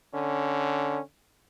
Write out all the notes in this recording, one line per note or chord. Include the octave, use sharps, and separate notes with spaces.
D3 C#4